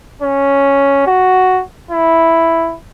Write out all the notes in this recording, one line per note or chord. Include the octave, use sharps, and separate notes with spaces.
C#4
F#4
E4